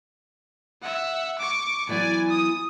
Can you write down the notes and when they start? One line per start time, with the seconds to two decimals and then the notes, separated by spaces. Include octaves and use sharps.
0.82 E5 F#5
1.39 C#6 D6
1.89 E3 F#3 B3 D5 G#5
2.29 D#6